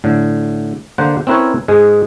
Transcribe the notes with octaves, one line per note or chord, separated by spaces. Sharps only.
A2 D3
D3 A#3 C5 D5 F#5
C4 C#4 E4 A#4 B4 C#5
G#2 G#3 G#4